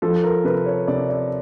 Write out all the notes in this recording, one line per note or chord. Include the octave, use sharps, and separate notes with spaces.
F3 A4
A#4
C3 B4
C#5
C3 D5
D5